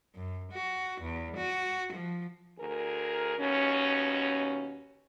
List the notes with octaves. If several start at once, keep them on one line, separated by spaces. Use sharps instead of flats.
F#2
F#4
E2
F#4
F3
D2 G#4 A#4
D#2 B2 C#4